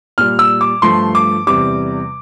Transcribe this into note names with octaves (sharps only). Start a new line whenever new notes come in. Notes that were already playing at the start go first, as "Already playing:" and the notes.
A#2 G3 F6
E6
D6
G2 F3 A3 C6
D6
E2 C3 G3 D6